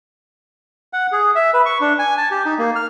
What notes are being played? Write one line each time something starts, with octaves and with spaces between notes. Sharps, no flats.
F#5
G#4
E5
B4
C#6
D4
G#5
A5
G4
D#4
A#3
F6